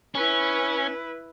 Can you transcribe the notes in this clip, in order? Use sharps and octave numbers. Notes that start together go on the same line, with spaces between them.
C#4 E4 B4